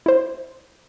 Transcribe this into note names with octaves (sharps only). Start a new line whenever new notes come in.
E4 C5